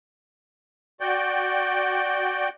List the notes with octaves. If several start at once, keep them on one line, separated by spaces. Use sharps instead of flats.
F#4 D5 G5